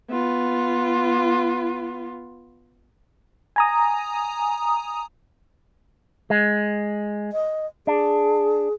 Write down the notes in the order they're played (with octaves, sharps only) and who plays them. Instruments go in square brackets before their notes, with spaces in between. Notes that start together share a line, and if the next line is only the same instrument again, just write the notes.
[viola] B3 F4
[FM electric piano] G#5 A#5 D#6
[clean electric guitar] G#3
[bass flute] D#5
[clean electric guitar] D4 [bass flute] G#4